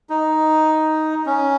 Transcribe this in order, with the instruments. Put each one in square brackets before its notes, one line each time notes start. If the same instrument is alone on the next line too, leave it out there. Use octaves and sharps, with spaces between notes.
[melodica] D#4
C#4